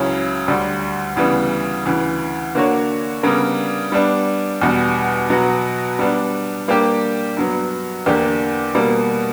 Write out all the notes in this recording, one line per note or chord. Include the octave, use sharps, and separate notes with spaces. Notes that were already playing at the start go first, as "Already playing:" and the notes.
Already playing: C#2 C#3 F#3 C#4 E4
D2 D3 G3
D2 C#3 E3 G3 B3
D2 C#3 E3
D3 A#3 D4 F#4 C#5
C#3 G3 B3 D4 A#4
G3 B3 D4
E2 B2 G3
B2 F#3 B3 F#4
G3 B3 D4
G3 A#3 D4 G4
G2 F#3 B3
E2 D3 A#3 D4 G4
B2 G3 A#3